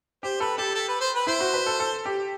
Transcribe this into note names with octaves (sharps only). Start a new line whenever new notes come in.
G4 C5
A4 B4
G4 A4
A4
B4
C5
B4
E4 C5
F#4
B4
A4
A4
G4